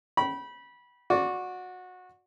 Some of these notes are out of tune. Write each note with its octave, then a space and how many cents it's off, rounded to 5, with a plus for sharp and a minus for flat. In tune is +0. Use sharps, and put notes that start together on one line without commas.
G5 -30 B5 -20
F#4 -20 D5 -5 D6 -25